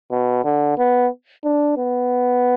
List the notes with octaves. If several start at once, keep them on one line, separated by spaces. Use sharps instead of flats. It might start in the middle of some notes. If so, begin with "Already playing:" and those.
B2
D3
B3
D4
B3